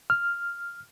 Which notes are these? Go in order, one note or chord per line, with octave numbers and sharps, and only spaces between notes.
F6